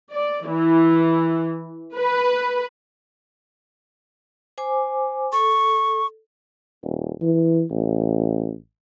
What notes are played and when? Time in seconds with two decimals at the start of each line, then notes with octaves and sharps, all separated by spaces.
0.13 D5
0.49 E3
1.96 B4
4.58 C5 G#5 D6
5.33 A4 C#6
6.83 D#1
7.21 E3
7.71 A1